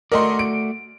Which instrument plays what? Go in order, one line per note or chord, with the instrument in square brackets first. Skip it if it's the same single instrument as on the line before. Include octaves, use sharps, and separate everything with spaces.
[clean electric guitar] A3 F#4 D5 [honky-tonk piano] A#4 D#5 C6
[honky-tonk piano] D7